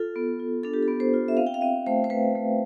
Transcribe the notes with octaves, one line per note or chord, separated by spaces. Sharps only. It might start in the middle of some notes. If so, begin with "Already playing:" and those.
Already playing: F4 A4
B3
F4
D4 A4
G4
A4
B3
C5
F4
E5
C4 F5
G5
F5
C4 E5
A3 C5
C5
A3 B4
A3